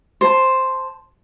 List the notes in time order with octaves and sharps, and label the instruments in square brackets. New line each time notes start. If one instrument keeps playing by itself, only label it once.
[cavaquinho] C5 A5